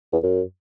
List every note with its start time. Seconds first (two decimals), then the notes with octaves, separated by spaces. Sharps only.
0.12 E2
0.23 F#2